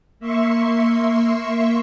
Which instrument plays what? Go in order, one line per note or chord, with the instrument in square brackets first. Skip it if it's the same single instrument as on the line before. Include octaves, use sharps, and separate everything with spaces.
[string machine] A#3 E5 C6 C#6